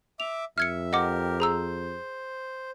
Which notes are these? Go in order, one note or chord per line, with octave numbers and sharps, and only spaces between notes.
E5 D6 F7
F2 E5 F6 G#6 C#7
G4 A#4 D#5 F#5 D6
G#4 C5 A#5 E6